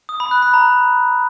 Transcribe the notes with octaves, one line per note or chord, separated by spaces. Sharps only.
D#6
B5
F#6
B5
A#5